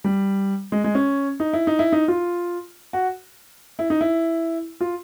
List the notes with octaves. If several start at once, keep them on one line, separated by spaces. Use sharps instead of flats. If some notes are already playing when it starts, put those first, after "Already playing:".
G3
G#3
G#3
C#4
D#4
E4
D#4
E4
D#4
F4
F#4
E4
D#4
E4
F4